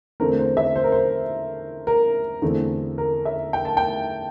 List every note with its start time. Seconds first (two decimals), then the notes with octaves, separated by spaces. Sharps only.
0.20 E2 D3 A3 C4 A#4
0.39 C5
0.57 E5
0.76 C5
0.84 A#4
0.92 C5
1.87 A#4
2.42 E2 D3 A3 C4
2.98 A#4
3.25 E5
3.53 G5
3.65 A5
3.77 G5